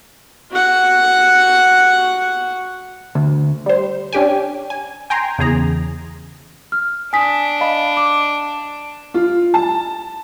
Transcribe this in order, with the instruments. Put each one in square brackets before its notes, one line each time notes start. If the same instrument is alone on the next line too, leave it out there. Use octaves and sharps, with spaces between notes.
[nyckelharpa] F#4 F#5
[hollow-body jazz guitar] D2
[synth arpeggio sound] G3 C5
C#4 D4 G4 G5 G#5
G#5
G5 G#5 A#5 C6
E2 C#3 G#4 A#5
[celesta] F6
[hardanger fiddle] D4 [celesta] G#5 D#6 B6
[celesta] D#5 F5 B5
D6
[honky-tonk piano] F4
A5